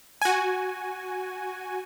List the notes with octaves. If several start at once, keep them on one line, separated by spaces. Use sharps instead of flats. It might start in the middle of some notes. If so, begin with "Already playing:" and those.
F#4 G#5